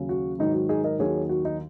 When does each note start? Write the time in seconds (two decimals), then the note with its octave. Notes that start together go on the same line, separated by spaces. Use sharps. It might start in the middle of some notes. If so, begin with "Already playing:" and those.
Already playing: D#2 C#3 F#3
0.09 F#4
0.39 G#2 D#3 F#3 D#4
0.54 F#4
0.69 D#4 G#4
0.84 A#4 D#5
0.99 D#2 D#3 F#3 G#4 C#5
1.29 F#4
1.45 D#4